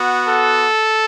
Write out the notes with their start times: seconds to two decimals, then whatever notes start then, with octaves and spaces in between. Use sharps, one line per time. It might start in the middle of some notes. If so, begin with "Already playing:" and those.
Already playing: B3 F#4
0.26 A4